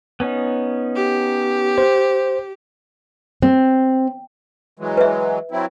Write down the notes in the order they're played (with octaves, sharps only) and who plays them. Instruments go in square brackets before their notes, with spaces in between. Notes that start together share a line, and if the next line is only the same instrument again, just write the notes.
[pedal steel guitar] B3 C#4 D#4
[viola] G4
[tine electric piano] C5
[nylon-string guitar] C4
[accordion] E3 F#3 G#3
[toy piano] B4 E5
[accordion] F#3 C4 E4